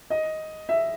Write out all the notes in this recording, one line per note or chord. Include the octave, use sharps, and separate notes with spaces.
D#5
E5